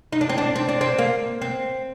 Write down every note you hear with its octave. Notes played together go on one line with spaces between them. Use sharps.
D#4
D4
C4
D4
C4
D4
C4
A#3
C4